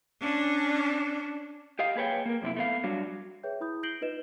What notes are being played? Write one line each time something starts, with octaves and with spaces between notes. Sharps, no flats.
C#4 D4
G4 D#5 F5
A#3 G#4 B4 C#5 G5
A#3 A#4
F#2 C3 C#4 E4
A3 B3 F5
F#3 G3 D4 F#4
G#4 B4 C#5 E5 G5 G6
E4 B5 D#6 G6
G6 A#6 C7 D7 F#7 G7
D#4 F4 B4 D#5 E7